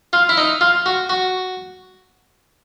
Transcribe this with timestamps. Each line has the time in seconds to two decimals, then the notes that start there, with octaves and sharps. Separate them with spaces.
0.13 F4
0.29 E4
0.38 D#4
0.61 F4
0.86 F#4
1.09 F#4